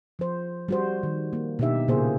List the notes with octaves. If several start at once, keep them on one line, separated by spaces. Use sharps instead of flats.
F3 C5
G3 F#4 C5
D#3
A#3
B2 D4 D#4 G4 E5
A#2 C#3 A#3 F4 G#4 C5